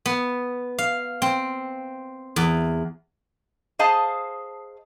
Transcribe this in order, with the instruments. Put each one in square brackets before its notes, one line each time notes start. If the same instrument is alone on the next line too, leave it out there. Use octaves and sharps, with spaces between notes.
[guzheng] B3
F5
C4
E2
[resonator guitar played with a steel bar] G#4 C5 D#5 F5 A5